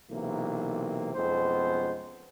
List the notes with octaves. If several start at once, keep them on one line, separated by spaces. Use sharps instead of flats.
B1 C3 E3 A#3
B1 F2 G#3 B3 C#4 C5